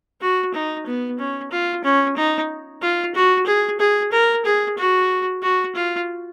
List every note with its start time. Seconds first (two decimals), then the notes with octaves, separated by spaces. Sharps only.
0.21 F#4
0.54 D#4
0.87 B3
1.19 C#4
1.51 F4
1.84 C#4
2.17 D#4
2.82 F4
3.15 F#4
3.46 G#4
3.80 G#4
4.12 A#4
4.45 G#4
4.78 F#4
5.42 F#4
5.75 F4